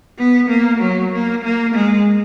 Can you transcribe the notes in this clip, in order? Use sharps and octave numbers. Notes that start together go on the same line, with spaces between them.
B3
A#3
F#3
A#3
A#3
G#3